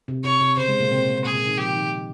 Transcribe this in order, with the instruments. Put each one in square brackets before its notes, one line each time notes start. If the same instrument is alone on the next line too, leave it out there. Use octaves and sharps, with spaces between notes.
[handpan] C3
[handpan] C3 [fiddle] C#5
[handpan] C3
[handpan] C#3 [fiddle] C5
[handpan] G#3
A#2 A#3
C3 C4
A#2 A#3
[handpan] A#2 A#3 [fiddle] G#4
[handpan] A#2 A#3
D#3 D#4
[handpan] F3 F4 [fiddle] G4
[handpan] D#3 D#4